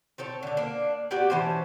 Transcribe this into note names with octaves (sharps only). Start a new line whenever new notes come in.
C4 A4 C#5
D3 D4
A#3 D4
B3 F#4 G4 D5
E3 C#4 C5 A5